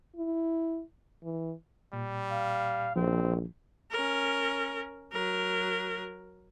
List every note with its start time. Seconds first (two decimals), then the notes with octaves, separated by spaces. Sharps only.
0.16 E4
1.24 E3
1.93 A#2 G3
2.31 F5
2.96 A#1 F3 C4
3.92 C#4 A#4
5.13 F#3 A#4